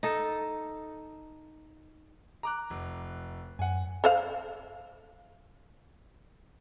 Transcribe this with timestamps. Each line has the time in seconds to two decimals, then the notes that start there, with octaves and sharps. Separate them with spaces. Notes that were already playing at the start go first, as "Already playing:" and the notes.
0.03 D#4 A4
2.43 A#5 D6 F#6
2.70 F1
3.59 F#2 F#5 G#5
4.04 A4 C5 F5